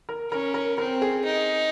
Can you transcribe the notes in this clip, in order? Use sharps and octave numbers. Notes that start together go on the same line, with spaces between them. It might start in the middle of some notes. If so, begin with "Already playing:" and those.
A#4
C#4 A#4
A#4
C4 A#4
G#4
D#4